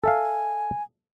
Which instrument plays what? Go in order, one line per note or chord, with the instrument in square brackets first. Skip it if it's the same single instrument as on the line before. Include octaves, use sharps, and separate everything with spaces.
[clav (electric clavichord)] A4 E5 F5 [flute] G#5